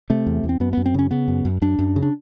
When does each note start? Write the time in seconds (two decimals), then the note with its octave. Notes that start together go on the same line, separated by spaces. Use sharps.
0.10 C3 A3
0.26 E2
0.44 E2
0.49 C4
0.60 F#2 B3
0.73 B3
0.77 F#2
0.86 C4
0.94 C#3 C#4
1.11 C#3 B3
1.28 F#2
1.45 F#2
1.62 F#2 D4
1.79 F#2
1.96 C#3
2.02 D4